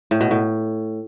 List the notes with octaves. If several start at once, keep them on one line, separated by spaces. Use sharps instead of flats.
A2
B2
A2